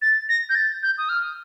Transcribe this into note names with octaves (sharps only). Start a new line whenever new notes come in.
A6
A#6
G6
A6
G6
D#6
F6